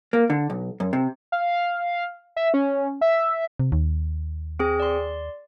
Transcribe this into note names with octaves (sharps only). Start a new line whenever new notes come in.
A#3
D3
B1
F#2
C3
F5
E5
C#4
E5
C3
D#2
C4 G#4 G#5
D5 C6